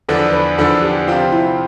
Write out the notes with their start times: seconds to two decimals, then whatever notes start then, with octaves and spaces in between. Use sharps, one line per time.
0.09 E2 D3 F3 B3 D4 A4
0.33 B4
0.58 E2 D3 F3 B3 D4 A4
0.82 G4
1.08 C3 F3 C4 F4 G4
1.32 E4